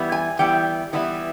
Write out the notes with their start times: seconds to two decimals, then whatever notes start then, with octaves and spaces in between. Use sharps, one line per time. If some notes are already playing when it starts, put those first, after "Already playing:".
Already playing: E3 G3 B3 E4
0.12 G#5
0.39 E3 G3 B3 E4 G5
0.93 E3 G3 B3 E4